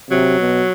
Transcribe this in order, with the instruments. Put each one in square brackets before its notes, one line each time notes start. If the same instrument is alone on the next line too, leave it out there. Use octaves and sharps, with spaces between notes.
[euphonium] C3 [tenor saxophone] F#3
[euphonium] B2